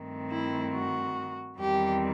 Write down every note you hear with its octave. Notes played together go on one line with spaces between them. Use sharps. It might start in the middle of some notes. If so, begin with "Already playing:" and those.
Already playing: G2 D#3 A3 C4
E4
F#4
E2 D#3 G3 C4 G4